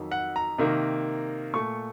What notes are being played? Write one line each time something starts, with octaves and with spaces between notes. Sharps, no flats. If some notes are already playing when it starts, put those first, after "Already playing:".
Already playing: F2 D#3 F#3
F#5
A#5
C3 D#3 A#3
A#2 A3 C#6